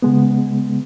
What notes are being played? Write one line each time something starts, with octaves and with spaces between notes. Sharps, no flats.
C#3 G#3 B3